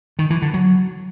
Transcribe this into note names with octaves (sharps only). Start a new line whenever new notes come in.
D#3
E3
D3
F#3